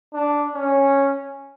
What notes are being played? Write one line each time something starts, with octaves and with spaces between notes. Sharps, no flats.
D4
C#4